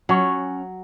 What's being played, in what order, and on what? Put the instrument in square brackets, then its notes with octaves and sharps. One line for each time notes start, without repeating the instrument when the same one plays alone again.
[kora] F#3 [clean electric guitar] C#4 C#5